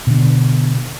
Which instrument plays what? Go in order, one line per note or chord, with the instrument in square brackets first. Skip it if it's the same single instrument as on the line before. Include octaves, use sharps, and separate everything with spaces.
[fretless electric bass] B2 D3